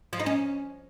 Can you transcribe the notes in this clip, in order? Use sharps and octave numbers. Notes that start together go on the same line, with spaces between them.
F3
D#4
C#4